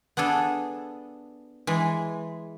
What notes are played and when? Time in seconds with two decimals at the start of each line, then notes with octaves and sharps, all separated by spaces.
0.17 B3 D4 G#4 A4
1.67 E3 G#3